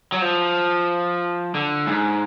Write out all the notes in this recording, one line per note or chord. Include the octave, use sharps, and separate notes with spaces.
F#3
F3
D3
G#2